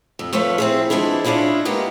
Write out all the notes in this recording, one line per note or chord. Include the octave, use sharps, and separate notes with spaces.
F2
F3 A3 B4 C#5 F5
C4 E4 G#4
E3 F3 G#3 D4 E4 G#4
C#4 D4 E4 F4 D#5
G#3 A#3 B3 G4